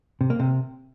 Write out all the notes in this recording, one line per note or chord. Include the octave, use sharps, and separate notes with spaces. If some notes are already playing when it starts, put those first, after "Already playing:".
C3
A#3
C3